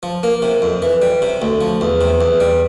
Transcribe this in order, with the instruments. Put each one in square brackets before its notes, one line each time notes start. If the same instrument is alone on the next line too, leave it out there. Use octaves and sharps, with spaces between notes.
[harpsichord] F3
A#3
C3
F2
E3
G3
C3
D2
F3
E2
C3
E2
G3